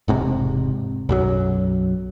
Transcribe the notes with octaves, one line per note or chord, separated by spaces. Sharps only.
E1 G#2 C3
B1 F#2 F#3